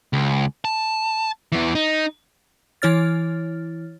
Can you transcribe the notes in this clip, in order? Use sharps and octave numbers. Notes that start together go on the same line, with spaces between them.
C#2
A5
E2 E3
D#4
E3 E4 C#5 F6 A6